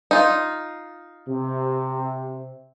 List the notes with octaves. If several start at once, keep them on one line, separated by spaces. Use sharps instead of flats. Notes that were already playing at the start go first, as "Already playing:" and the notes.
D#4 F4
C3